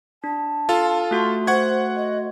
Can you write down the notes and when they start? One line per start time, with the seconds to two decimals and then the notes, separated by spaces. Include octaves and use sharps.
0.24 D4 A5
0.69 F4 A4 F5
1.11 A3 F#4 C6
1.47 C5 F#5 C#6 G#6
1.96 D#5